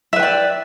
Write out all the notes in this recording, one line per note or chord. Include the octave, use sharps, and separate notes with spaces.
B4 D5 E5 G5